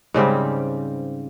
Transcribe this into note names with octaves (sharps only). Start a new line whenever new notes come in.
G#2 C#3 G3 C4